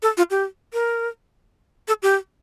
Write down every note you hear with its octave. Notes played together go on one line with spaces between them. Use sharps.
A4
F4
G4
A#4
A4
G4